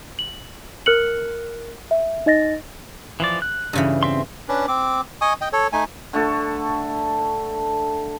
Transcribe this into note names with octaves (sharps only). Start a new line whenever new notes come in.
F#7
A#4 F6 F#6 C#7 F#7
E5
D#4 D#5 A6 A#6
E3 F3 D5
F#6
G2 C#3 E3
C4 E5 C6
C#4 D4 B4
C4 D6
D#5 G#5 C#6 D#6
D#5 G5
A4 C#5
A3 D#4 G#5
D3 A3 A4